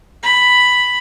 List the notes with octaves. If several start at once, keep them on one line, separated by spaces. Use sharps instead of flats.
B5